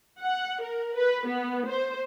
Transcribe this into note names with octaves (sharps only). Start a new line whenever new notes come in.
F#5
A#4
B4
B3
C5